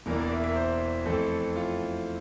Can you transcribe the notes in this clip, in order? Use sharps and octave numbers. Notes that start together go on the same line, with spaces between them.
E1 E2 E3 A#3 D4 A#4
D5
E5
E5
A#4
C5
F2 E3 A3 C4 A4
F4